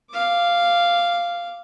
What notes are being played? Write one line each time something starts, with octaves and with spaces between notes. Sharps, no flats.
F5 D6